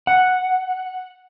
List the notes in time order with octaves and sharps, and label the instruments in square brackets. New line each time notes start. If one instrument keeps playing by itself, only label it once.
[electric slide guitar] F#5